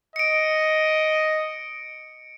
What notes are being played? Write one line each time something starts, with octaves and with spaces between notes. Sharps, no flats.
D#5 C#7 D7